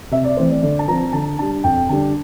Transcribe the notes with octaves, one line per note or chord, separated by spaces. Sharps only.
C3 E5
D5
E3 A3 C4 C5
D5
D3 D5
A5
F3 C4 A#5
D3 A5
G3 D4 A5
F2 G5
D3 G3 D4 A5